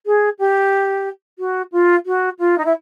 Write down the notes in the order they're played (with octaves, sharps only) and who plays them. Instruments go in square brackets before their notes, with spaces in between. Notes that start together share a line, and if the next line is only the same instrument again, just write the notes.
[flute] G#4
G4
F#4
F4
F#4
F4
D#4
E4